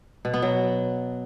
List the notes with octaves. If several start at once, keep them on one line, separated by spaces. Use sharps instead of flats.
B2
B3
F#3